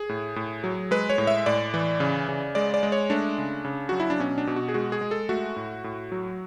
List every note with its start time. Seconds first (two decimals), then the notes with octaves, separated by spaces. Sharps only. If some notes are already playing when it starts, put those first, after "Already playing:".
Already playing: G#4
0.09 A2
0.36 A2
0.64 F#3
0.91 G#3 B4
1.10 C#5
1.18 A2
1.27 E5
1.46 A2 D5
1.74 E3
2.00 C#3
2.29 C#3
2.55 G#3 D5
2.74 D5
2.83 G#3
2.92 C#5
3.10 A3 D4
3.38 C#3
3.65 C#3
3.89 F#3 F#4
4.00 E4
4.10 D4
4.20 B2 C#4
4.38 D4
4.47 B2
4.56 F#4
4.68 G#4
4.74 G#3 F#4
4.92 G#4
5.01 G#3
5.11 A4
5.29 A3 F#4
5.56 A2
5.84 A2
6.12 F#3